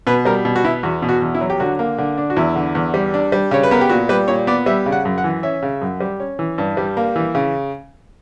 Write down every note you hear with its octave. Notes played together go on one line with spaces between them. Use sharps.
B2 B4
G3 A#4
B2
F#4
B3 E4
E2 F#4
B2
F#4
E2
E4
F#3
G4
D3 F#4
A#3
D3
D4
F#4
E2 E4
D3
E2
G3
D4
G3
C#3 C#5
B4
B3 A#4
G4
A#2 F#4
G3 B4
A#2 C#5
B3 D5
G3 E5
C#3
F#5
F#2
F#5
E3
C#4 E5
C#3
F#2
G3
C#4
E3
G2
G3
A#3
E3
C#3